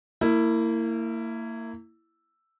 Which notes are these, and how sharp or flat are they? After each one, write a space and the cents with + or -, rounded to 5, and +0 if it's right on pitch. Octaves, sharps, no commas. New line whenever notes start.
A#3 -30 E4 +0